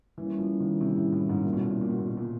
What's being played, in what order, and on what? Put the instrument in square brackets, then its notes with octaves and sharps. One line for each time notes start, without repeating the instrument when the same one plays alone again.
[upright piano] E3 [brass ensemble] G3 A#3 C#4 E4
[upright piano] F3
D#3
C3
A2
A2
G#2
A#2
B2
A#2
B2
A#2
B2
A#2
B2
A#2